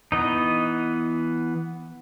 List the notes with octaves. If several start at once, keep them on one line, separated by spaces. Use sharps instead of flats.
E3 B3 D#4 D#5